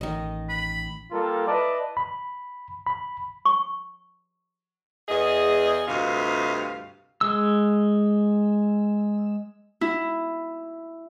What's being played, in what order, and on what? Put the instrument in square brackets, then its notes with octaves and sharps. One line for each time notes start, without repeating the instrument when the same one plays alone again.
[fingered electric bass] A1 [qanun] D#3 D#5
[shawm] B5
[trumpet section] G3 A#3 F4 A4 A#4
E4 B4 D5 D#5 A5
[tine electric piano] B5
B5
[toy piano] C#6
[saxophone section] E2 G#4 D#5
D2 G2 C3 F4 D#5 F5
[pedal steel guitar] G#3 E6
[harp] E4